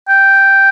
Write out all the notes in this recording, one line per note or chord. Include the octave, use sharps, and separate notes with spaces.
G5